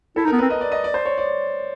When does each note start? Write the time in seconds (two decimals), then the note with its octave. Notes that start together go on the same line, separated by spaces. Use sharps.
0.16 E4 A4
0.25 D#4
0.28 A#4
0.33 B3
0.38 B4
0.42 C4
0.50 D#5
0.61 D5
0.72 D#5
0.84 D5
0.94 C5
1.05 C#5
1.18 D5